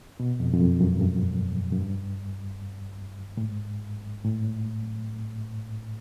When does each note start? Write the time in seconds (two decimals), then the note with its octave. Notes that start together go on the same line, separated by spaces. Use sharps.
0.20 B2
0.40 F2
0.54 F2
0.60 F#2
0.80 F#2
0.93 G2
1.01 F#2
1.72 F#2
1.81 G2
3.37 A2
3.44 G#2
4.25 A2